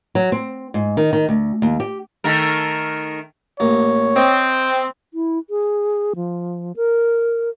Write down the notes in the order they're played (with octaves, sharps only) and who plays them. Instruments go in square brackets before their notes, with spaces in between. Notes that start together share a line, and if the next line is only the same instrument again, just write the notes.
[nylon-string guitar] F#3
C4
G#2
D#3
D#3
D2
D#2
G4
[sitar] D#3 A3 A#4
[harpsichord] A1 A#3 [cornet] C#5
[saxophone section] C4 [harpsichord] D#5
[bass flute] E4
G#4
F3
A#4